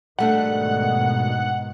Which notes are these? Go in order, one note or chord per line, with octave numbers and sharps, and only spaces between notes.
G#2 B2 D#3 G3 A3 D4 F#5